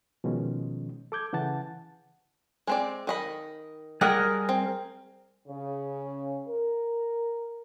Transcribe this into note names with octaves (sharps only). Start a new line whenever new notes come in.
B2 D#3 F3 G#3 C#4
A4 D6 G6 G#6
C#3 E3 F#5 A5 A6
G#3 C4 D5
D#3 D#5 B5
G3 G4 G#4 A#4 D#5 F#5
C4
C#3
A#4